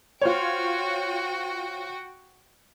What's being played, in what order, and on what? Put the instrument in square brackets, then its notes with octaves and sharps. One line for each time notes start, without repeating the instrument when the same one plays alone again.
[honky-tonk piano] F4 C5 C#5 [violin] F#4 G5